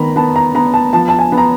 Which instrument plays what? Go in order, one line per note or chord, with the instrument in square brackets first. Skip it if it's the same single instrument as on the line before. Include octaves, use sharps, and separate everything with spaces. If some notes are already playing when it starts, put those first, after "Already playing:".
Already playing: [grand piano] D#3 B3 A#5 B5
B3 A5
A#5
B3 A#5
A5
F3 A5
A5
G#5
B3
A#5